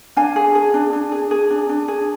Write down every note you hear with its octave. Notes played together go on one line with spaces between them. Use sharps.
D4 F5 G#5
G#4
G#4
D4
D4
G#4
G#4
D4
D4
G#4